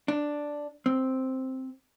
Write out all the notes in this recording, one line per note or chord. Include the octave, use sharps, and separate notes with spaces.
D4
C4